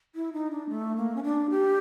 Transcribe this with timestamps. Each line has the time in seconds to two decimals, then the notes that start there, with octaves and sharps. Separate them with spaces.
0.15 E4
0.33 D#4
0.51 D4
0.69 A3
0.97 A#3
1.16 C#4
1.23 D4
1.50 G4